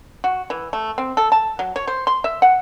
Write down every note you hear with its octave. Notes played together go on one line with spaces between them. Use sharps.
F#4
E3
A3
C4
A4
A5
F#3
C#5
C5
C6
E5
F#5